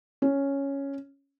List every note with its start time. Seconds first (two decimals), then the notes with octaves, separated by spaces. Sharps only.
0.22 C#4